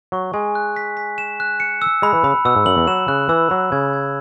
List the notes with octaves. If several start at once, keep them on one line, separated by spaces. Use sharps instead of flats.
F#3 C#6
G#3 G#5
F#6
B6
B6
E7
F#6
C#7
E6
G#3 B5
E3
C#3 B5
B2 E6
G#2
F#2 F#7
E2
F#3 E7
C#3 F#6
E3 E6
F#3 B5
C#3 G#6
G#6